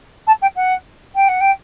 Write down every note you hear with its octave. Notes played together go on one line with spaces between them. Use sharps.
A5
G5
F#5
G5
F#5
G5